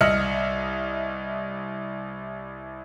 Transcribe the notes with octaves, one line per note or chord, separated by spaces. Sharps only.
C2 D#5 E5 F6 C#7 F#7